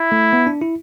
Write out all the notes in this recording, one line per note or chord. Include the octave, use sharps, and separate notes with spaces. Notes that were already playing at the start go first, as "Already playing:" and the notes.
Already playing: E4
A3
B3
D4
E4